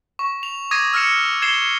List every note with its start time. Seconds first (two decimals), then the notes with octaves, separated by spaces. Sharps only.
0.19 C#6
0.43 F7
0.71 D6 D#6 G#6 A#6 D#7
0.93 E6 F6 A#6 C#7 E7
1.42 G#6 C7 E7 G7